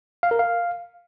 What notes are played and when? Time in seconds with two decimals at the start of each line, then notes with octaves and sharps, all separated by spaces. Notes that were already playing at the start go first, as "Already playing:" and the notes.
0.23 F5
0.31 A#4
0.39 F5